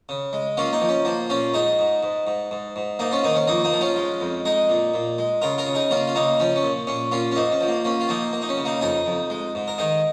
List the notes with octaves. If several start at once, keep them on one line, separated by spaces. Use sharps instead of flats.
C#3
G#3
A#3 C#4 F4
A#3 D#4
F3
C#4
F3 A#3
A#2 C#4 F4
G#2 D#4 G#4
G#2
G#2
G#2
G#2
G#2
G#2 A#3 D#4
C#4 F4
D#3 A#3 D#4
C#4
F2 A#3 D#4
A#3 D#4
F3
C#4 F4
G#3
F2
G#3 D#4 G#4
A#2
A#2
G#3
C#3 F4 A#4
F4 A#4
C#3
D#4 G#4
A#3 C#4 F4
F4
C#3 A#3 D#4
F3 C#4
C#4
A#2
A#2 C#4
A#2 C#4 F4
C#4
G#2 A#3 D#4
C#4
F3
A#3
A#3 C#4
F4
F3 A#3 D#4
A#3
D#4
C#4
C#3
A#3 D#4
F2 D#4 G#4
F2
G#3
G#2
A#4
D#3 D#4 G#4